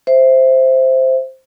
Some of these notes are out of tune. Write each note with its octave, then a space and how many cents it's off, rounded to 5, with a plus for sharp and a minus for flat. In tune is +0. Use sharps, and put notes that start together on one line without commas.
C5 +0 E5 +0